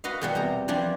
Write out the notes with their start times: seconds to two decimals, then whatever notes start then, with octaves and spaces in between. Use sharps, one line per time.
0.04 F#4 B4 D#5 F5
0.21 E2 B2 G3
0.35 E2 C3 A#5
0.68 E3 F3 G3 D4